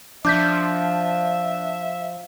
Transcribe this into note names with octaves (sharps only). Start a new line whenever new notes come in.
F3 D4 E5 D6 G6 B6